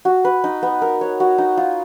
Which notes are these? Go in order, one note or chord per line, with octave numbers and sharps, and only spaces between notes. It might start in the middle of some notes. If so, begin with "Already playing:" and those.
F#4
B4
D#4
B3
A#4
C#5
F#4
D#4
F4